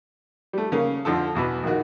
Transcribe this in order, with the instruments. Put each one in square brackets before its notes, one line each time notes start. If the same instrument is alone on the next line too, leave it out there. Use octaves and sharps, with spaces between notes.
[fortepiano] G3 A3
C#3 A#3 F5
F2 D3 F3 A4
E2 B2 E3
A#1 D#3 F#4